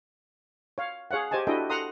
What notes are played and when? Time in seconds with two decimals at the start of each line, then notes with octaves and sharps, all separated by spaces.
0.78 C#5 F5
1.11 G#4 C#5 F5 F#5
1.31 G4 C5 D#5 G#5 A5
1.47 D4 E4 F#4 A4 D#5 G5
1.70 A4 F#5 A#5 C6 D#6